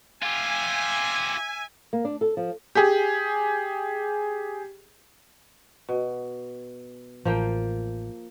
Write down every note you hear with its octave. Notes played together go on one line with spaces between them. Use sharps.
F4 G4 E5 G#5
A#3
D4
A4
F3
G4 G#4
B2
A1 F3 A#3 G5